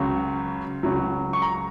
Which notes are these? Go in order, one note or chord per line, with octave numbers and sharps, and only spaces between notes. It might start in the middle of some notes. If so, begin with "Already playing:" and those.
Already playing: C#2 C#3 F#3
C#2 C#3 F#3
C#6
A#5